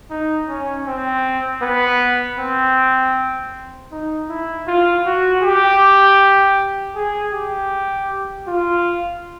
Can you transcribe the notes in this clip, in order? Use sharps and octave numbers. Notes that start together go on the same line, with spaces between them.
D#4
C#4
C4
B3
C4
D#4
E4
F4
F#4
G4
G#4
G4
F4